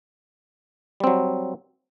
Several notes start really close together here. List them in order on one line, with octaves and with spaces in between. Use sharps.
G3 C4 F#3